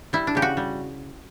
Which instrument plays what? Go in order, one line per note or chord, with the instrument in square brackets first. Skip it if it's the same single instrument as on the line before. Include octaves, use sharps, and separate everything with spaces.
[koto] G3 E4
D4
C#3 G4
F#4
G3